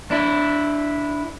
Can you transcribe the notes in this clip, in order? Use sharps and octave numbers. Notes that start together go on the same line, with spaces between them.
D4 E4